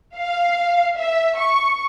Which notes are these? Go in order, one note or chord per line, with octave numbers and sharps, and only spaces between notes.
F5
E5
C#6